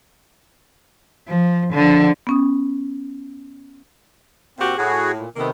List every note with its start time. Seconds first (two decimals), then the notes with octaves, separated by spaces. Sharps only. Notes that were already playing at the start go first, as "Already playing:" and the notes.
1.28 F3
1.73 D3 F3
2.27 B3 C#4 D#6
4.59 A#2 C4 F#4 G4
4.77 A2 F#4 G#4
5.18 A#2
5.36 C3 D#3 A#3 B3 A4